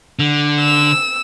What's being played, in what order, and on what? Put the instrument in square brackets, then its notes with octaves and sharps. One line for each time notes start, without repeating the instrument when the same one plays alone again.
[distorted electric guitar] D3
[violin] E6